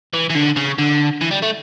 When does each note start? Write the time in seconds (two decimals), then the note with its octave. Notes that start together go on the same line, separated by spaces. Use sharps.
0.14 E3
0.30 E3
0.36 D3
0.57 C#3
0.78 D3
1.21 E3
1.31 G3
1.43 A3